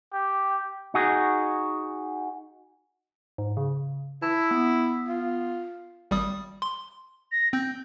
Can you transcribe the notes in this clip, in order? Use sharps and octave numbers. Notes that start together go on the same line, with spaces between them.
G4
D#4 F#4 G#4
G#2
C#3
E4 A5
B3
F4
G#1 G3 D#6
C6
A#6
C4 G6